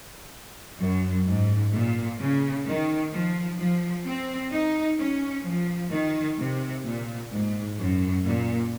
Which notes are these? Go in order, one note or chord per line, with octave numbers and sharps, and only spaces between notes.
F#2
G#2
A#2
C#3
D#3
F3
F3
C4
D#4
C#4
F3
D#3
C3
A#2
G#2
F#2
A#2